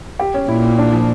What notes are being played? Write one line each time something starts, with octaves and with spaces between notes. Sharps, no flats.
G4
C#4
A#2 E4
E4
D4
F3